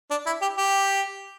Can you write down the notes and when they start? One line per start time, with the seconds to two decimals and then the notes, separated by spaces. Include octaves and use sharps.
0.10 D4
0.26 E4
0.42 G4
0.58 G4